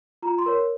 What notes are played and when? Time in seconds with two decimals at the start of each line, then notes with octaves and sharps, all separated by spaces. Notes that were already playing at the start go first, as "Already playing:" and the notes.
0.22 F4 A#5
0.38 C6
0.46 A#4 C#5